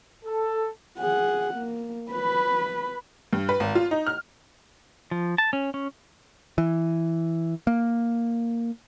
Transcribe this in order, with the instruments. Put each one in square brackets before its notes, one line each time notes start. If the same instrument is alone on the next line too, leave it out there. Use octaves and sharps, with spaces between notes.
[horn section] A4
[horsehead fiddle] G#4 F#5
A#3
B4 B5
[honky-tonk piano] G2
B4
G#1
F4
D#4
F6
[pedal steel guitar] F3
A5
C#4
C#4
[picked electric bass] E3
A#3